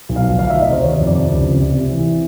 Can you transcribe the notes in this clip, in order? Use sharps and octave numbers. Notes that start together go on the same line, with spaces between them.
B1
F5
F3
D2 F5
E5
D#3
D#5
C3 C5
D#3 C#5
F2
D5
C3
C#2
C#2
C3
C3
E3